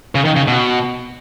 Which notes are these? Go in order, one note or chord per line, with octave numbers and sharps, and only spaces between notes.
C#3
D#3
C#3
B2